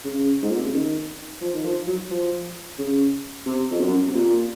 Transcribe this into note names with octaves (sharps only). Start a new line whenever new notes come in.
C#3
G#2
A#2
C3
C#3
D#3
F3
D#3
F3
F#3
F3
C#3
C3
F2
F#2
C3
A#2